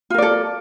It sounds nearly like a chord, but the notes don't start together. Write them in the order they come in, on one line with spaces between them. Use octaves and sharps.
F4 A#4 D5 A4